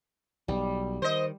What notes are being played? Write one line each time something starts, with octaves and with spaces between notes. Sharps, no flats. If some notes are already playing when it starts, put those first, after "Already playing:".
B1 G3
D#3 C5 D#5